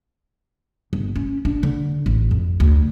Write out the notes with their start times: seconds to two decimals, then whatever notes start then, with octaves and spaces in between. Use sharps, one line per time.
0.93 G1
1.16 C#4
1.45 D4
1.63 D3
2.06 A1
2.31 F2
2.60 D2